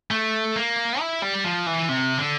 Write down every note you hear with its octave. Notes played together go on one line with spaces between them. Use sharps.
A3
A#3
E4
G3
F3
E3
C3
D3